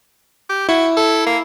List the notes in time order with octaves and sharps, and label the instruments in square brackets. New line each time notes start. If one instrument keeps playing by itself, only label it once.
[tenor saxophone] G4
[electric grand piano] E4 [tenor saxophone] F#4
[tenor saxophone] A4
A#3